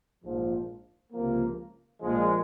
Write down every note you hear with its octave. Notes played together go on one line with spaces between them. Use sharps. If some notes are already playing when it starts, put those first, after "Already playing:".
A#1 G#2 F3
C#2 C3 F3 A#3
A#1 A#2 F3 G#3